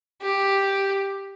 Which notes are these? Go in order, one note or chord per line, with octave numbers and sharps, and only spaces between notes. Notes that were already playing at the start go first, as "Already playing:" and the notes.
G4